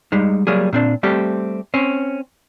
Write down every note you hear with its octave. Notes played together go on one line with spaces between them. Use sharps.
G3 G#3 D#4
F#3 G3 A#3 G#4
A#2 C4 D4
G3 A3 C4 G4
C4 C#4